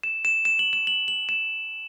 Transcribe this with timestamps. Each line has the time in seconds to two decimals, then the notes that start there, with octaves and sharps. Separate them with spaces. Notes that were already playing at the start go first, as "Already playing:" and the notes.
0.03 E7
0.25 E7
0.45 E7
0.59 F#7
0.73 E7
0.87 F#7
1.08 F#7
1.29 E7